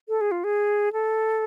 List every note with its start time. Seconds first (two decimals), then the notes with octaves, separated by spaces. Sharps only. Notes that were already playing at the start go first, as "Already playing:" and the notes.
0.09 A4
0.21 G#4
0.31 F4
0.44 G#4
0.93 A4